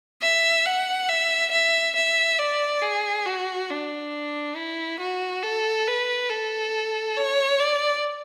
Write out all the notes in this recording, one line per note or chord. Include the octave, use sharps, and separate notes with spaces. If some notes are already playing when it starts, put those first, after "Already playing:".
E5
F#5
E5
E5
E5
D5
G#4
F#4
D4
E4
F#4
A4
B4
A4
C#5
D5